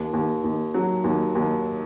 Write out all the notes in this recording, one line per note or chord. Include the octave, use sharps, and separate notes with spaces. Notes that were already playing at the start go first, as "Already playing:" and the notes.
Already playing: D#2
D#2
D#2
F#3
D#2
D#2